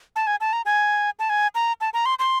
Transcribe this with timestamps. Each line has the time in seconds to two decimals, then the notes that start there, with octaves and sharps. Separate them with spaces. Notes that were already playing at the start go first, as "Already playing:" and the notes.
0.16 A5
0.27 G#5
0.41 A5
0.53 A#5
0.65 G#5
1.19 A5
1.30 G#5
1.55 A#5
1.81 A5
1.94 A#5
2.06 C6
2.19 C6